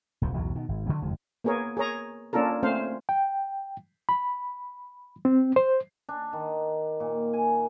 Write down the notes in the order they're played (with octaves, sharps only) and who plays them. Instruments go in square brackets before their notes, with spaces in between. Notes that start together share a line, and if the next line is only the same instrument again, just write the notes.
[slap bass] D#1 C2 F3
B1 E2 A2 F#3
B2 D#3
G#1
B2 D3 F#3 A#3
F#1 F2 D#3 G#3
[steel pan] A#3 B3 G#4 A#4 C#5
G#4 A#4 C#5 A#5
A#3 C#4 D4 F4 A4 A#4
A3 C4 C#4 C5 F5
[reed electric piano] G5
B5
C4
C5
[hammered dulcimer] D4
D#3
A#2
G#5